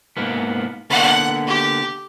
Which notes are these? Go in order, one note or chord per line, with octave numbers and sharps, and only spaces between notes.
G#2 A#3 B3
D3 A#3 B3 F#5
G4